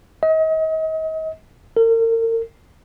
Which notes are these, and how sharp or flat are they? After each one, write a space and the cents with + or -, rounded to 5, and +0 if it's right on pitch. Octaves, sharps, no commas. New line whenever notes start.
D#5 +35
A#4 -40